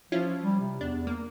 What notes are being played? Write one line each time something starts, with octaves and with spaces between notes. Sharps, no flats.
F3 C#4 E4 F4
G3
C3
E2 D4
A#3